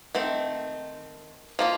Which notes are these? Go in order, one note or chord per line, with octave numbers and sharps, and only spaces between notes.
D#3 A3 C4
F3 A#3 F4